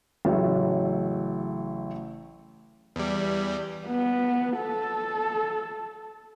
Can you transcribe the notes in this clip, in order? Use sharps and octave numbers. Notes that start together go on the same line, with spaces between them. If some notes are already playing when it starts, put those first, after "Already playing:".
A1 C#3 F#3 A3
E2 G3
B3
A4